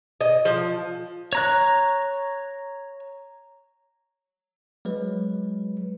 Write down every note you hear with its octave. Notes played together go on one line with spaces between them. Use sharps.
D#5
F3
C#5 A#5 F#6
F#3 G#3 B4